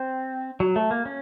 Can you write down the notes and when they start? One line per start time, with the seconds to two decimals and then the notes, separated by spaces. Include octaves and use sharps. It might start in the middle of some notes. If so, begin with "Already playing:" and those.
Already playing: C4
0.60 F#3
0.76 A3
0.91 A#3
1.06 C#4